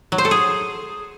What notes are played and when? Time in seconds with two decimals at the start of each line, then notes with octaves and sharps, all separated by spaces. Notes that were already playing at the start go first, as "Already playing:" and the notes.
0.12 F#3
0.18 C5
0.25 A4
0.31 G#4